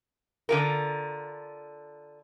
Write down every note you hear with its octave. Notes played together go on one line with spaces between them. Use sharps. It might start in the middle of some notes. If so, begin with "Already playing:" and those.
D3 F4 A#4